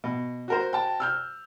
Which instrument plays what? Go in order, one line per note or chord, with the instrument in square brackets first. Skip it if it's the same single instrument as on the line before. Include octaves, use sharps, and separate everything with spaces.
[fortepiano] B2
F#4 A#4 C5
[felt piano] G5 A5
E6 F6 G6